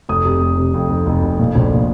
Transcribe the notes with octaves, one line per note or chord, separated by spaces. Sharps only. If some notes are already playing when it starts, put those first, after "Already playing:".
F1 D#6
C3
F1
C3
F2
F1
F1
F1
A#2
A#1
A#2